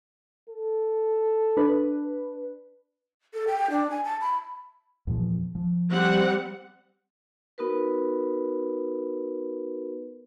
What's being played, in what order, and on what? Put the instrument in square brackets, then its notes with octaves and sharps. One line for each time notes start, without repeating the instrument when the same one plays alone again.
[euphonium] A4
[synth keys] D4 B4
[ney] A4
G5
D4
G#5
A5
B5
[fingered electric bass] E2 A#2 F3
F3
[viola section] G3 C4 F#5
[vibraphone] B3 D#4 F#4 A#4 B4